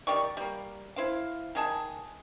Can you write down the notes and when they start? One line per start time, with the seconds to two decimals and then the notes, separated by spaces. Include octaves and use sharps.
0.07 D#3 G4 D5 C#6
0.37 G3 A#3
0.96 E4 C5 F5
1.55 D#3 G#4 A5